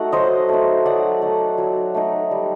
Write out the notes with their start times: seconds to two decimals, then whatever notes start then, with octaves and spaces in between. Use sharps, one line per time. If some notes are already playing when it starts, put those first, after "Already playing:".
Already playing: A3 D#4 F#4 A4 F#5
0.12 F#3 C5 D#5
0.49 A3 D#4
0.86 F#3 D5 F#5
1.22 A3 D#4
1.58 F#3
1.95 A3 D#4
2.31 G3